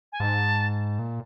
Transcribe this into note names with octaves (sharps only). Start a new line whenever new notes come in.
G#5
G#2 A5
A#2